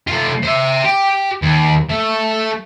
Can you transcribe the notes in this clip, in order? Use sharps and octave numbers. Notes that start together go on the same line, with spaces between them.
A3 F4
C5 E5
G4
D#2
A3